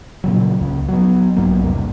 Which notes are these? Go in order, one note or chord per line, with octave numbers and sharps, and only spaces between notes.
A#2 C#3 F#3
C#2 C#3
F#3 B3
B1 G#2 F#3 A#3
E2 G2 C3